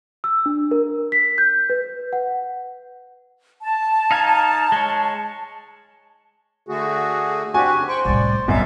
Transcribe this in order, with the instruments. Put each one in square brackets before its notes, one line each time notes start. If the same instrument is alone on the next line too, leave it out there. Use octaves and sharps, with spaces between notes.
[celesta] E6
D4
A#4
B6
G6
B4
F#5
[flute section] A5
[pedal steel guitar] D#4 F5 G#5
G#3 C#5
[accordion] D3 A3 F#4 [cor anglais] G#4
[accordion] C4 D4 G4 [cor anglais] F#4 [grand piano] G#5
[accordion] F2 C#3
[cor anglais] C5 [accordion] G5 C#6 F#6
[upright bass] C2 A2 [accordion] D5
[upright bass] C2 [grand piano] F#2 B2 [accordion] G3 E5 F5